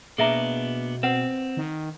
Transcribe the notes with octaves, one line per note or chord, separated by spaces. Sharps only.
B2 A#3 B3 D4 G#4 E5 A#5
C4 B4 F#5
D#3